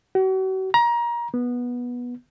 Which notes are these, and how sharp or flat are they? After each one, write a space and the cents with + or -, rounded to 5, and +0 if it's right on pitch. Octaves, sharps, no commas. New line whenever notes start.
F#4 +40
A#5 +25
B3 -15